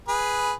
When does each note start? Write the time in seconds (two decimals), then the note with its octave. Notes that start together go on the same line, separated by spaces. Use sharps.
0.08 G#4 B4